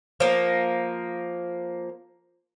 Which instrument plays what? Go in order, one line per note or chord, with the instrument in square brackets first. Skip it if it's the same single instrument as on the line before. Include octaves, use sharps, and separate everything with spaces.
[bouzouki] F3 A#3